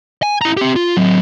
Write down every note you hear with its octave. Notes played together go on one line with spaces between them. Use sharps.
G#5
E4 A#5
C4 G4
F4
F#3 C4